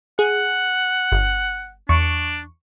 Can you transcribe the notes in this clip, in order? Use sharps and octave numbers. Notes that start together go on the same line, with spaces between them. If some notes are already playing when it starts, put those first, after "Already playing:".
G#4 F#5
G1
E2 D4 C#6